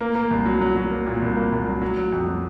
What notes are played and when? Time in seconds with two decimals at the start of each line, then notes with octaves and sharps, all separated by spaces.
0.01 A#3
0.15 A#3
0.31 C2
0.46 F#3
0.61 F#3
0.76 F#3
0.91 A#3
1.06 A#2
1.22 C2
1.36 A#3
1.52 C2
1.66 F#3
1.82 F#3
1.97 F#3
2.12 F2
2.27 F#3